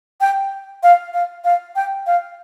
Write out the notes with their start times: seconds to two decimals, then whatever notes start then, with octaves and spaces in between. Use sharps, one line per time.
0.21 G5
0.83 F5
1.14 F5
1.44 F5
1.76 G5
2.07 F5